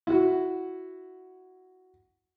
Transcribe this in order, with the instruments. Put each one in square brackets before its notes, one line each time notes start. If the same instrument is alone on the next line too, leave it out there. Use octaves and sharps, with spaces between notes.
[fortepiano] E4 F#4